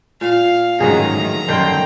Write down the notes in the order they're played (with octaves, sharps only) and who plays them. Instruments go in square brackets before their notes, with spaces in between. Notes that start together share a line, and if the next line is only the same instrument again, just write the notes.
[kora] A#2 [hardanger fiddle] F5
[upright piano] A1 G#2 [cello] D#3 F3 [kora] F#3 G#4 [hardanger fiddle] A#5
[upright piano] D2
[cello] F#2 G5 [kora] D3 D#3 [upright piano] G3 C6 C7